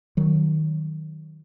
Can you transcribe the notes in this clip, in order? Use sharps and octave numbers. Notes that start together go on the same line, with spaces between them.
D#3 F#3